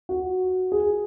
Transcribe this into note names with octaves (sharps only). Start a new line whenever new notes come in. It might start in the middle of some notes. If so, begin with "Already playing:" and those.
F#4
G#4